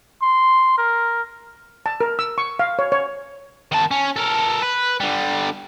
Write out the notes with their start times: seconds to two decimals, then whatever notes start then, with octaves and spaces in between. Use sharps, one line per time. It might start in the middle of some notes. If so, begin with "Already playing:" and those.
0.22 C6
0.78 A#4
1.86 A5
2.01 A#4
2.19 E6
2.38 C#6
2.59 F5
2.79 C#5
2.92 C#5
3.72 D#3 A5
3.91 C#4
4.16 A4 A#4
4.62 B4
5.00 D3 G3